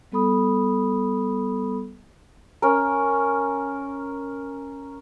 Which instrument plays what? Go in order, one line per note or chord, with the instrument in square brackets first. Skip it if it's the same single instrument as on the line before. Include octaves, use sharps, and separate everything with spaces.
[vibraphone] G3 B3 A4 B5 D#6
[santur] C#4 A#4